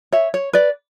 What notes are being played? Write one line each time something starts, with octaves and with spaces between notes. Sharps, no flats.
C#5 E5
C#5
B4 D5